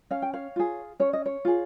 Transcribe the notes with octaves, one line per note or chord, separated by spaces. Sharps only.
C#4 F5
G5
C#5 F5
F4 G#4
C#4 C#5
D#5
C#5
F4 G#4